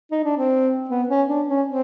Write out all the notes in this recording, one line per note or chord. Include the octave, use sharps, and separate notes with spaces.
D#4
D4
C4
B3
C#4
D4
C#4
C4